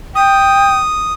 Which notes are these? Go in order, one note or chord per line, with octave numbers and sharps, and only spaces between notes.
G5 D#6